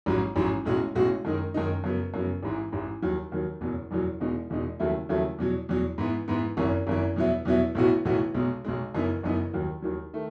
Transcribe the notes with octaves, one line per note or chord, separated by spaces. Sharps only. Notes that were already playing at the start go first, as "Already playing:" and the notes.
A1 G#2 F#3 C#4
A1 G#2 F#3 C#4
B1 A2 G#3 C#4 F#4
B1 A2 G#3 C#4 F#4
F#2 D#3 G#3 D#4
F#2 D#3 G#3 D#4
F#2 C#3 F#3 B3
F#2 C#3 F#3 B3
A1 G#2 E3
A1 G#2 E3
D#2 D#3 F#3
D#2 D#3 F#3
F#1 E2 B2 F#3
F#1 E2 B2 F#3
E1 E2 B2 G#3 D#4
E1 E2 B2 G#3 D#4
D#2 C#3 F#3 A3 E4
D#2 C#3 F#3 A3 E4
E2 B2 F#3
E2 B2 F#3
G#2 E3 B3
G#2 E3 B3
G#1 F#2 E3
G#1 F#2 E3
E2 B2 F#3 B3 E4
E2 B2 F#3 B3 E4
B1 A2 E3 B3 F#4
B1 A2 E3 B3 F#4
B1 B2 G#3
B1 B2 G#3
F#1 F#2 E3 B3 D#4
F#1 F#2 E3 B3 D#4
D#2 D#3 F#3
D#2 D#3 F#3
D#3 A3